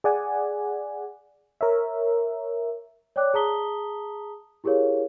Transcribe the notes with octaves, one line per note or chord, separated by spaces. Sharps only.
G#4 D5 F#5 G#5
A#4 C#5 E5
C#5 D5 G5 D6 F#6
G#4 A5 A#5 D#6 B6 G7
E4 G4 G#4 A#4 C#5 F5